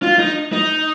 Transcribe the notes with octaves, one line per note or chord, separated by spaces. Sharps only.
F4
D#4
D#4